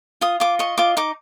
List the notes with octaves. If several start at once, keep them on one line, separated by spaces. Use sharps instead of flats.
F4 D#6
F4 D6
D#5 C#6
F4 D6
D#4 D6